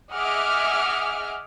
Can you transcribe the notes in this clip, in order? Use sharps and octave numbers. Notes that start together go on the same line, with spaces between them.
G#4 D#5 E5 F#5 D6 F6